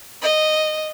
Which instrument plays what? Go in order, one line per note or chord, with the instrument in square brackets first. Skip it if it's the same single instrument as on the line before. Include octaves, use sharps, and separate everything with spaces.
[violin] D#5